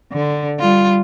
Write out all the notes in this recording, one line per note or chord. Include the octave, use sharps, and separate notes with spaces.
D3
G3 F4